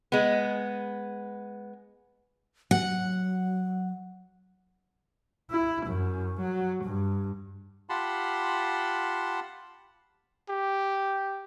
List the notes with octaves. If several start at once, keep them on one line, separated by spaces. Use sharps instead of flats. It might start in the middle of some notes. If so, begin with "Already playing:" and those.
G#3 B3
F#3 F#5
E4
F#2
F#3
G2
F4 G4 F#5 A5 B5 C6
G4